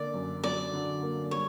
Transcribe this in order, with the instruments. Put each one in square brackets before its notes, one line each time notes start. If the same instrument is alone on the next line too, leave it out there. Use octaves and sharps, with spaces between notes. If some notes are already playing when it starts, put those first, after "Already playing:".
Already playing: [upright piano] D3 A#3 [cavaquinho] D5
[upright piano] F#2
[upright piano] F#3 [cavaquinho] D5
[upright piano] D3
A#3
[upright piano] G3 [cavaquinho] C#5